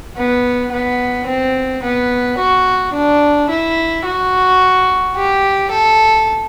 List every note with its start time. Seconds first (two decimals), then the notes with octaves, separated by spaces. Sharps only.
0.17 B3
0.72 B3
1.27 C4
1.83 B3
2.38 F#4
2.93 D4
3.50 E4
4.05 F#4
5.16 G4
5.71 A4